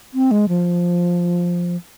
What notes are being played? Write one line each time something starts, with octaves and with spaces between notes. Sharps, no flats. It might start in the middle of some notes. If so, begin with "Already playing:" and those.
C4
G#3
F3